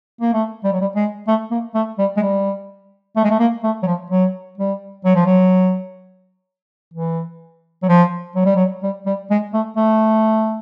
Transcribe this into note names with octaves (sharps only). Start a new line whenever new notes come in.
A#3
A3
G3
F#3
G3
G#3
A3
A#3
A3
G3
G#3
G3
A3
G#3
A3
A#3
A3
F#3
F3
F#3
G3
F#3
F3
F#3
E3
F#3
F3
F#3
G3
F#3
G3
G3
G#3
A3
A3